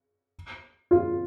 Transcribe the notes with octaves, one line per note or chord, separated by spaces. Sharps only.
F4